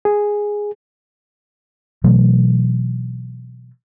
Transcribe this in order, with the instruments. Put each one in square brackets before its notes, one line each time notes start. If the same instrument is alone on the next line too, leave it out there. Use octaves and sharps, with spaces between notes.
[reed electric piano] G#4
[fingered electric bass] B2 E3 F#3 A3